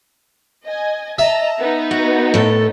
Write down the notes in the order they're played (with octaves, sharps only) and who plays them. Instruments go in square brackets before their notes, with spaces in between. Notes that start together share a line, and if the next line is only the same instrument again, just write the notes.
[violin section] D#5 G#5
[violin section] D#5 A5 A#5 [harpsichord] E5
[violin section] B3 D#4 B4
[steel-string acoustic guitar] F#4
A2 A4